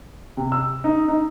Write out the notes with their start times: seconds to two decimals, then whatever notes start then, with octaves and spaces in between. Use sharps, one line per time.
0.37 C3
0.52 E6
0.84 D#4
1.08 D#4